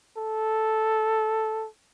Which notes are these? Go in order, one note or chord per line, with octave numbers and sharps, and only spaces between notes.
A4